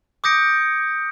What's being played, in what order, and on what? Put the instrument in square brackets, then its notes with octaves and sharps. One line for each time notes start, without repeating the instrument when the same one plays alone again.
[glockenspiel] D6 D#6 G6 A#6 C#7 D7